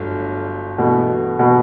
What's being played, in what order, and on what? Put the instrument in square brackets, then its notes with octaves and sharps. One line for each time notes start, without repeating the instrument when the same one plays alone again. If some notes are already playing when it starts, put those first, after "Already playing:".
Already playing: [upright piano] G1 G2 F#3 A3
[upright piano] G2 E3 A3 [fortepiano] B2
[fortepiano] B2